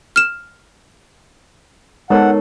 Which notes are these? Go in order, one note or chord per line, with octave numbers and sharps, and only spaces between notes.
F6 E7
G#3 B3 D#4 A4 A#4 C#5 F#5